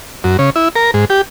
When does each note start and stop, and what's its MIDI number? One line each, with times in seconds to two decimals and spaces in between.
0.24 0.37 42
0.39 0.50 49
0.56 0.68 64
0.76 0.91 70
0.94 1.05 44
1.10 1.21 67